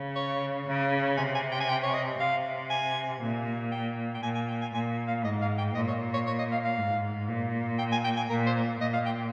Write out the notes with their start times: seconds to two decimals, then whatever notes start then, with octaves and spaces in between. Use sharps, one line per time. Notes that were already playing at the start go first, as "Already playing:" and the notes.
Already playing: C#3
0.16 C#5
0.67 C#3
1.17 C3 G#5
1.35 G#5
1.51 G5
1.60 G#5
1.69 G5
1.83 C#5
1.94 D#5
2.19 C3 F5
2.70 G#5
3.21 A#2
3.72 G5
4.15 G5
4.23 A#2 G#5
4.35 G#5
4.48 G5
4.61 G#5
4.74 A#2 G#5
5.08 F5
5.24 G#2 D#5
5.42 F5
5.58 G5
5.75 A#2 D#5
5.88 C#5
6.14 C#5
6.27 C#5
6.39 D#5
6.52 F5
6.65 F5
6.77 G#2
7.28 A#2
7.78 G5
7.92 G#5
8.04 G5
8.17 G#5
8.30 A#2 A#4
8.47 C5
8.80 A#2 D#5
8.94 F5
9.06 G5